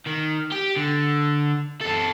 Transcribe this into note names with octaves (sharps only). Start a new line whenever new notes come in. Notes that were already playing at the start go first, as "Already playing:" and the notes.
D#3
G4
D3
F#2 A4